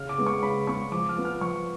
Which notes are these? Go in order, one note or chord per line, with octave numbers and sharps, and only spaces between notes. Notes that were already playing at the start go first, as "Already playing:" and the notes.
Already playing: C#3 F6
D6
G#3 B3
C#6
C#3 B5
G#3 B3 C#6
F3 D6
F6
B3 F4
F6
F3 C#6